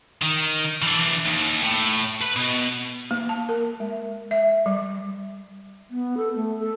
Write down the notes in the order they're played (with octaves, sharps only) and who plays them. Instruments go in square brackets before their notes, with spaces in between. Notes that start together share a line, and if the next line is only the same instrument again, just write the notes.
[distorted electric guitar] D#3
E3 D4
D#2
A2
B4 B5
B2
[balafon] A#3
A5
A#4
G#3
E5
G3
[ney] B3
A4
A3
A4